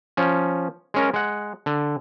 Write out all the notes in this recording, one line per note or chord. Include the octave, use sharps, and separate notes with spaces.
F3 C#4
G#3 C#4 A#4
G#3 F#5
D3